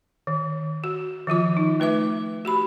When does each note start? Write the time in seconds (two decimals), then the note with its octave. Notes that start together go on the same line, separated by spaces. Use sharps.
0.27 D#3
0.84 F#4
1.27 D#3 F3 F4 D6
1.57 D#4
1.80 A3 B4 E5 D6
2.45 F#4 G4 B5